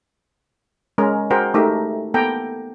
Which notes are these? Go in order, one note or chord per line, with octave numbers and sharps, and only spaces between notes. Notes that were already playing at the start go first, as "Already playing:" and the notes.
G#3 C#4 A#4 A#5
F#4 G#4 A#4 C5 F#5 G5
A3 D#4 G4 A#4 E5
A#3 B3 A4 G5 A#5